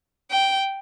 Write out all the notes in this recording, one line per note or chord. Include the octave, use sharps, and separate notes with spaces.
G5